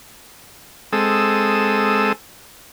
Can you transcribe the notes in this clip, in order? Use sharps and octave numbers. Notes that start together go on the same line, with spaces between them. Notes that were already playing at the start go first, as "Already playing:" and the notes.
G#3 C4 A4 D#6 E6